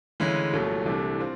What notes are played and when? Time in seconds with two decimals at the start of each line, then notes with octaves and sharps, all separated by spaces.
0.20 D2 C#3 E3 G#3 C#4
0.53 C2 A#2 F#3 A3 C#4
0.85 C2 C3 E3 A3 D4
1.19 C4 F4